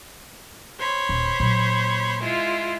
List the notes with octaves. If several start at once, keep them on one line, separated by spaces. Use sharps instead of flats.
C5 C#5 B5
D#1
A#2 F#3
G#3 E4 F4